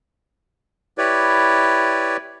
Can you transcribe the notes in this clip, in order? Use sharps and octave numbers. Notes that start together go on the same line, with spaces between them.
E4 G4 B4 C#5 D5